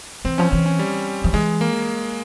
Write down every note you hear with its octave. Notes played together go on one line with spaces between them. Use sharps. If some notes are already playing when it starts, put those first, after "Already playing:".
E3 C4
F3 C#4
E3 C#4
C#4
G3
F3
E3 G#3
A#3